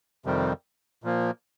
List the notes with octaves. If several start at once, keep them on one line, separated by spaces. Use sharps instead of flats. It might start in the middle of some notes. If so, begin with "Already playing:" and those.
F2 C3 D#3 G3
A#2 F3 A#3